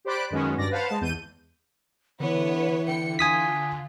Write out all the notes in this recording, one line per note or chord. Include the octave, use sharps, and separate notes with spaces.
G4 C5 D5 B5 F#6 D7
F#2 D#3 G#3 B3 C#4 F#4
G2 D5 A#6
B4 C5 F5 F#5 A5
G#3 A5
E2 G6 D#7
D3 E3 B3 B4 C#5
D3 G5 C#7
F4 G#5 D#6 B6